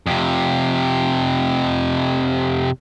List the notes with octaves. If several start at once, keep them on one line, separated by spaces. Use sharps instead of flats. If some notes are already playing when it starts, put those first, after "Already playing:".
F2 C3